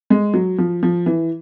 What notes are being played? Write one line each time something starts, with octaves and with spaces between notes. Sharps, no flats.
G#3
F#3
F3
F3
E3